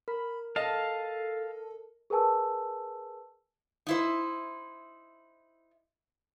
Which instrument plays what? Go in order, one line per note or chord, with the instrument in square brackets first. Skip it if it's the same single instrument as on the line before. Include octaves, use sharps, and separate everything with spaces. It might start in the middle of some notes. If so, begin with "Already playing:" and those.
[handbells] A#4 [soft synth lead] B5
[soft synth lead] A4 [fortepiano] D#5 [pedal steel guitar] F5 A5
[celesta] G#4 A#4 B4 G#5 A5 E6
[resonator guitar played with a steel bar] D#4 E4 C5